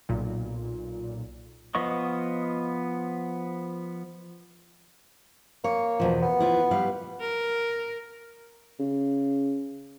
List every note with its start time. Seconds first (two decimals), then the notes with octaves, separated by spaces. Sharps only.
0.09 B1 A#2
1.75 F3 B3 D#5 C#6
5.64 A#3 C#5
6.00 E2 B2 F3
6.23 B3
6.40 E4 F4 B4
6.71 G3 B4 F5
7.20 A#4
8.79 C#3